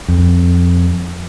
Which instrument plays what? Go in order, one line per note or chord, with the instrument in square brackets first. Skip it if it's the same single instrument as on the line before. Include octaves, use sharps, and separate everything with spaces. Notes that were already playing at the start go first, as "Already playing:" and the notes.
[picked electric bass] F2